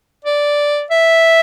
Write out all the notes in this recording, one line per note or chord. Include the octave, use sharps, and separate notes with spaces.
D5
E5